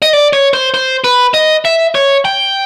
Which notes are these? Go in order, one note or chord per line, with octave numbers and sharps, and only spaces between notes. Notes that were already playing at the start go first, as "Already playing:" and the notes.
D#5
D5
C#5
C5
C5
B4
D#5
E5
C#5
G5